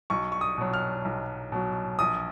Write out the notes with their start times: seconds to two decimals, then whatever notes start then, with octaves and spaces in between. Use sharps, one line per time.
0.10 B1 C#6
0.32 C#6
0.41 D#6
0.58 B2 F#3
0.74 F6
1.05 B1
1.52 B2 F#3
1.99 A#1 D#6